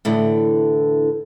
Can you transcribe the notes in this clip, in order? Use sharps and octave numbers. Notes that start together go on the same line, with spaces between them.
A2 D3 E3